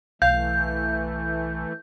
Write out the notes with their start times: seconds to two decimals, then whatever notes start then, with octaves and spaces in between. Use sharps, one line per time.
0.22 B1 E3 A3 F5 G6